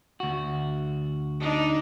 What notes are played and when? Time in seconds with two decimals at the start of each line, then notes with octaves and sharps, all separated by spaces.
0.20 D2 F#4
1.40 D4 D#4